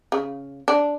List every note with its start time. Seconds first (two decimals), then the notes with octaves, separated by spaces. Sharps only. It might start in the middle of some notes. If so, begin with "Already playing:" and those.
0.12 C#3
0.68 D4